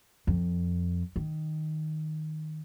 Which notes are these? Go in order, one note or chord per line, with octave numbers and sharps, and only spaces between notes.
F2
D#3